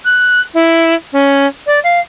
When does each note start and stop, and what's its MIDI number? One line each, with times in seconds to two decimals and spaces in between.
0.05 0.41 90
0.54 0.94 64
1.13 1.46 61
1.67 1.79 74
1.84 2.00 77